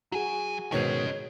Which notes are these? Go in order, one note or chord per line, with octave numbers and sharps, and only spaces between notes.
F#3 F#4 G#4 G#5
G#2 B2 D#3 C#4 C#5 D#5